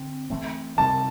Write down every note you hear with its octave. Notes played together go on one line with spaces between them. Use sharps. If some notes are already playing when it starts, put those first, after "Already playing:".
Already playing: D3 C4
E3 A3 C4
C3 G3 C4 A5